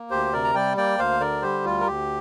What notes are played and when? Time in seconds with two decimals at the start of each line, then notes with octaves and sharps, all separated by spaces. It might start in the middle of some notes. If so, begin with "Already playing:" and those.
Already playing: A#3
0.11 D2 G4 C5
0.33 C3 A#4 D5
0.44 A#5
0.54 G3 D5 G5
0.77 A#3 D5 G5
0.98 D2 C5 F5
1.20 D3 A#4 D5
1.42 G3 G4 C5
1.65 D2 F4
1.80 A#4
1.87 D2 G4